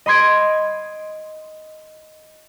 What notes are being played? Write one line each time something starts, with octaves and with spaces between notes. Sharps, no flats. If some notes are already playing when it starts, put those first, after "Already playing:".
D#5 B5 C6 G#6 D7